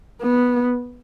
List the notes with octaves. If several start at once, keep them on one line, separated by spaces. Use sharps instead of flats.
B3